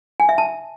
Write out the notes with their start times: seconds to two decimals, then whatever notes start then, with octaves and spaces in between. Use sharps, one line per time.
0.20 G#5
0.29 E5
0.38 A5